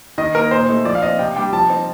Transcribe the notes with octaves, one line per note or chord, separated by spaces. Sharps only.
D#3 D#5
A#3 D#4 A#4
A#2 C5
A3 D#4
F3 D5
F5
C4 D#4 D#5
C3 G5
G3 D4 G5
F3 A5
C4 D#4